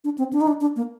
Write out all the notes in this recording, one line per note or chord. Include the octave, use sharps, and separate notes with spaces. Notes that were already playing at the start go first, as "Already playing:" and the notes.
D4
C4
D4
D#4
D4
D4
A#3